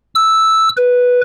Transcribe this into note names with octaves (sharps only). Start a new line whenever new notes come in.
E6
B4